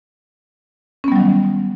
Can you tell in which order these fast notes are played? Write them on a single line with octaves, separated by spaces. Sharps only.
C#4 B3 G3 F#3 D#3